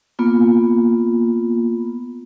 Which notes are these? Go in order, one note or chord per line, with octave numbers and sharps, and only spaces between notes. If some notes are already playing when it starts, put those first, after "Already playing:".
A#3 B3 F4